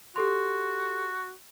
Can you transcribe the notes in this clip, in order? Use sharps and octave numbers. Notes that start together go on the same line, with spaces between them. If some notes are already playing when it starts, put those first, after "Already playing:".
F#4 G4 A4 C6